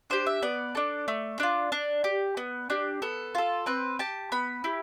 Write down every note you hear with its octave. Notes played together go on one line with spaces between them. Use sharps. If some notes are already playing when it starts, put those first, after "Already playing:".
D4 G4 C5
E5
B3 D5
D4 A4
A3
D4 F4
D4
G4
B3
D4 G4
B3 A4
F4 A4
C4 B4
G4 A5
B3 B5
E4 G4